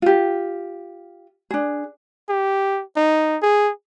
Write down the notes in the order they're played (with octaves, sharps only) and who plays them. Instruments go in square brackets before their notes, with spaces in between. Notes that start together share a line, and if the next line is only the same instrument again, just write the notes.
[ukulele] F4 G4
D4 G#4
[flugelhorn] G4
D#4
G#4